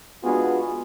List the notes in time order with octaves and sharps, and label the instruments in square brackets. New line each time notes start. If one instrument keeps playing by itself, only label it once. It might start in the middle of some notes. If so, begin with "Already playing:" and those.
[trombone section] G#3 B3 D4 F4 F#4 G#4